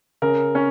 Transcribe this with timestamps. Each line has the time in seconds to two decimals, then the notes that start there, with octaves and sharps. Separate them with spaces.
0.22 C#3 A#4
0.55 C#4